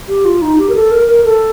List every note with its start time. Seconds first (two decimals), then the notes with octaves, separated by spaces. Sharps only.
0.09 G4
0.25 F4
0.42 D#4
0.58 G4
0.69 A#4
0.75 A4
0.91 A#4
1.07 A#4
1.24 A4